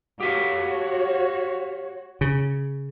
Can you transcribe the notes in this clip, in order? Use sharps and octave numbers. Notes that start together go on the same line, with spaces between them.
F#4 G4 C#5 E5 F5
C#3